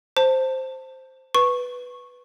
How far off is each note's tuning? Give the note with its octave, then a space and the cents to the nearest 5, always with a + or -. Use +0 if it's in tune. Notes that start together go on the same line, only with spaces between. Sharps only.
C5 +0 A5 +25
B4 +0 C#6 -10